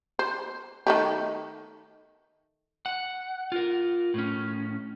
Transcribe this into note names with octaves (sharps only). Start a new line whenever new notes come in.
C5
D#3 A3 G4
F#5
F4 A#4
A2 C#4